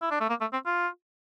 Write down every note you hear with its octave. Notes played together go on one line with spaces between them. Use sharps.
E4
D4
A3
A#3
A3
C4
F4